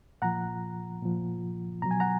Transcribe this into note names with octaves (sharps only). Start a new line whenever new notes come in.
A#2 F3 F#5 A#5
A#2 F3
B2 F#3 A#5
G#5
F#5 A#5